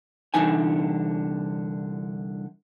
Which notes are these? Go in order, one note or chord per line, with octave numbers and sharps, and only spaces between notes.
C2 F2 D3 E3 D#4 G#5